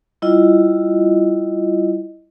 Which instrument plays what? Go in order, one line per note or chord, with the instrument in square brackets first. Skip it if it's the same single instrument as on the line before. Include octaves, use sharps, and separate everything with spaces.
[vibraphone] G3 E4 F4 D#5